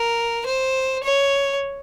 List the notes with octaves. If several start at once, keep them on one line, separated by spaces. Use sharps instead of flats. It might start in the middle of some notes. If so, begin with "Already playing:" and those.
Already playing: A#4
C5
C#5